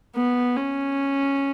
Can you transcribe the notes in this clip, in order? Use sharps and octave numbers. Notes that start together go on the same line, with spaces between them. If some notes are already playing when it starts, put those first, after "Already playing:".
B3
C#4